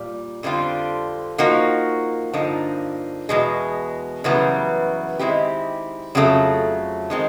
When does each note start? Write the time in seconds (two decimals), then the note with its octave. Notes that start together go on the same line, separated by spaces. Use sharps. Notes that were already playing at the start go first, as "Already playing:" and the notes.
Already playing: A#2 G3
0.43 F2 D3 G3 C4 F4
1.38 F3 A#3 D#4 F#4
2.33 G2 D3 F3 A#3 D#4
3.29 E2 B2 G#3
4.24 F#2 C#3 E3 G3 B3
5.19 D#3 G#3 C4 E4 G4
6.15 F2 C#3 F#3 A3
7.10 D#3 G#3 C4